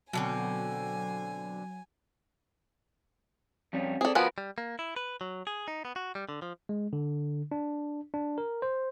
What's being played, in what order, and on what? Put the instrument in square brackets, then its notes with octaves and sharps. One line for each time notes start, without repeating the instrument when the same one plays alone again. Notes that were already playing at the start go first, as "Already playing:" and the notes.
[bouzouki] B2 D3 C4 [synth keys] F#3 [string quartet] G#5
[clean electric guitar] F2 G3 C#4
[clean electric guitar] C4 D5 [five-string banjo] G#4 A4
[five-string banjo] F3 B3 G#5 [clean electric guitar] F#4 A#4 B4
[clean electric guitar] G3
A#3
E4
B4
F#3
G#4
D#4
B3
F#4
G3
D3
F3
[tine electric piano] G#3
D3
D4
D4
A#4
C5